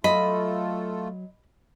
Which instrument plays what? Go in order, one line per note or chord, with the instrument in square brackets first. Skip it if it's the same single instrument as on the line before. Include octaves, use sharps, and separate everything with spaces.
[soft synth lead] F#3 [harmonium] A3 F4 A4 [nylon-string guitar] D#5 [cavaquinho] B5